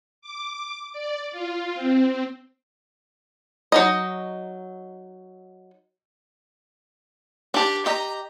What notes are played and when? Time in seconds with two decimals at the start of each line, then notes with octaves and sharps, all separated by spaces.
0.22 D6
0.93 D5
1.31 F4
1.75 C4
3.72 F#3 D#4 D#5
7.54 D4 G4 A5
7.86 G4 D#5 A#5